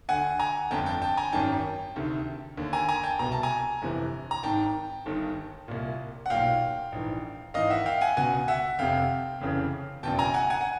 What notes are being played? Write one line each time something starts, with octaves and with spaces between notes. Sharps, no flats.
D2 D3 F#5 G#5
G#5 A#5
G1 F2 D3 G5 A5
G5 A5
G5 A5
G#5 A#5
G#1 F#2 D#3 G5 A5
D2 C3 D#3
D#2 D3
G#5 A#5
G#5 A#5
G5 A5
C2 B2 A#5
A5
G#5 A#5
G1 F2 C3 E3
A#5
G#1 G#2 D#3 G5 A5
G1 G2 D#3
C2 A#2
F#5
B1 A#2 F5 G5
A#1 G#2 E3
G#1 G#2 E3 D#5 F5
E5 F#5
F5 G5
F#5 G#5
C#2 B2 F#5 G#5
E5 F#5
F1 F2 C3 F5 G5
F1 F2 C#3 E3
F#1 E2 B2 G5 A5
G#5 A#5
F#5 G#5
F#5 G#5
F#5